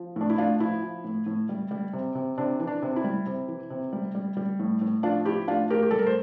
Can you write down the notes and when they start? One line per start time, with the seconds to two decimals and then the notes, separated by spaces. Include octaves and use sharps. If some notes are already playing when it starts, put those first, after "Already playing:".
Already playing: F3
0.16 A2 D4
0.30 E4
0.38 A2 D4 F4
0.60 F3 E4
0.82 F3
1.04 A2
1.26 A2
1.49 G3
1.71 G3
1.93 C3
2.15 C3
2.38 C3 D4
2.60 E3
2.67 D4
2.82 C3
2.96 E4
3.04 G3
3.26 C3
3.48 E3
3.70 C3
3.93 G3
4.15 G3
4.37 G3
4.59 A2
4.81 A2
5.03 F3 D4 F4
5.25 F3 E4 G4
5.48 A2 D4 F4
5.70 A2 G4 A#4
5.83 G4
5.91 G3 A4
5.99 A#4
6.06 C5